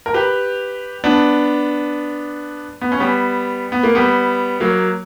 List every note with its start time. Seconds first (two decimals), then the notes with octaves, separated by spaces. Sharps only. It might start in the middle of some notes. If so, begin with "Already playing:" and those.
0.06 A#4
0.14 G4 B4
1.04 B3 D4
2.81 B3
2.92 C#4
3.00 G3 B3
3.72 B3
3.83 A#3
3.95 G3 B3
4.60 F#3 A#3